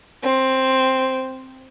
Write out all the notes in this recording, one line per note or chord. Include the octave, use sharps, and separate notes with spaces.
C4